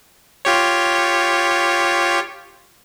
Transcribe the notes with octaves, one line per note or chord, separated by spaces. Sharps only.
F4 G4 C#5